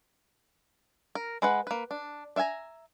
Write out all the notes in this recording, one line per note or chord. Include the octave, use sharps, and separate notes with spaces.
A#4
G#3 B4 F#5
A#3 B4
D4
D4 E5 F5 G#5 A#5